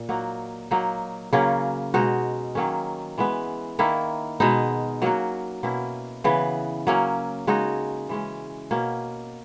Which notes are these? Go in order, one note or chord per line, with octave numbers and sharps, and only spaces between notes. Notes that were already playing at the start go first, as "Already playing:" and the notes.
Already playing: A#2
F#3 A#3 D#4 F#4
F#3 A#3 D#4
C#3 F#3 A#3 C#4
B2 G#3 D#4 F#4
D#3 F#3 A#3 C#4
E3 G#3 B3
D#3 A#3 E4
B2 G#3 B3 D#4
F#3 A#3 C#4 F#4
B2 A#3 C#4 E4
C#3 E3 B3
F#3 A#3 C#4
C#3 G#3 D#4 F#4
E3 G#3 C#4
B2 A#3 C#4